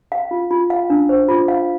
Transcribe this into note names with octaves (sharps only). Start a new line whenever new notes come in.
F5
F4
F4
F5
D4
C5
F4
F5